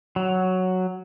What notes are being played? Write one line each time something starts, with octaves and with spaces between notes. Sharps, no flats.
F#3